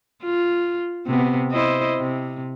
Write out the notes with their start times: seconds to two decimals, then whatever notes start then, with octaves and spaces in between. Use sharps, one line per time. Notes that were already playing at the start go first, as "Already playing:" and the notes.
0.23 F4
1.07 C3 B3
1.52 E4 C5 D#5
1.98 C3